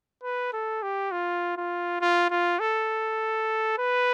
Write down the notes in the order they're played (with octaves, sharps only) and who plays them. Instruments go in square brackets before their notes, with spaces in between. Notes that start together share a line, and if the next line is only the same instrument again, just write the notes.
[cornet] B4
A4
G4
F4
F4
F4
F4
A4
B4